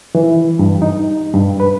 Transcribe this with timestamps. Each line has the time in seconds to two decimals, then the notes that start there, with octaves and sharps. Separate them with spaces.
0.15 E3
0.59 G2
0.82 D#4
1.33 G2
1.60 B4